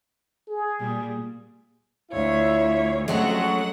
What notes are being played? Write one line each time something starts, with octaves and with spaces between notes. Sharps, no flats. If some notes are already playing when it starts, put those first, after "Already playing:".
G#4
A#2 G3
D2 E4 F4 C#5 E5
F2 F#3 G#3 A3 C#4 F#4 F#5